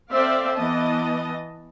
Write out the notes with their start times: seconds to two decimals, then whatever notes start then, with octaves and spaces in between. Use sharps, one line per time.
0.11 C4 A4 C5 D5 E5 F5
0.57 E3 B3 D#5 A5